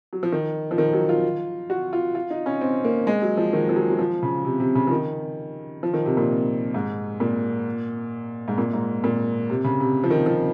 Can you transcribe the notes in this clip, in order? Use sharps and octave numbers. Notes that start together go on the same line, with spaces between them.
F#3
F3
D#3
F3
D#3
F#3
F4
F#4
F4
F4
D#4
C#4
C4
A#3
G#3
F#3
F3
D#3
F3
F#3
F#3
F3
C#3
C3
C3
C#3
F3
D#3
F3
D#3
C3
A#2
G#2
A#2
G#2
A#2
G#2
A#2
C3
C#3
C3
F3
D#3
F3